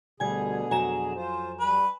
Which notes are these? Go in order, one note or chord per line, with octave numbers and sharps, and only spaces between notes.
D2 B2 D3 G3 G#4 G#5 G#6
F2 F#3 G#5 A#5 E7
F4 C5
G3 B4